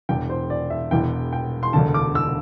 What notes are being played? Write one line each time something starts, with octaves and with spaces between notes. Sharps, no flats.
E1 E2 E3 G5
C5
D5
E5
E1 E2 E3 G5
G5
C6
E1 D2 D3 A5
D6
E6